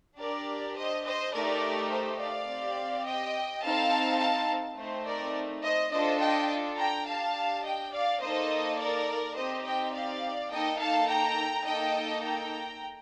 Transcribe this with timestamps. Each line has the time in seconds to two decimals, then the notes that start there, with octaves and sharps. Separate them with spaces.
0.18 D4 G4 A#4 D5
0.75 C5 D#5
1.04 C5 D#5
1.32 A3 D#4 G4 A#4 D5
1.90 C5
2.19 D5 F5
2.47 C4 G4
3.05 D#5 G5
3.63 C4 D#4 A4 F5 A5
4.19 F5 A5
4.76 A3 C4 D#4 C5
5.05 A#4 D5
5.63 C5 D#5
5.91 D4 F4 A4 C5 D#5
6.20 D#5 G5
6.77 G5 A#5
7.06 D4 G4 F5 A5
7.63 D#5 G5
7.92 D5 F5
8.21 A#3 D#4 A4 C5 D#5
8.78 A#4 D5
9.35 C4 D#4 G4 C5 D#5
9.64 D#5 G5
9.93 D5 F5
10.50 A#3 D#4 A4 D#5 G5
10.78 F5 A5
11.07 G5 A#5
11.65 A#3 D#4 A4 D#5 G5
12.22 G5 A#5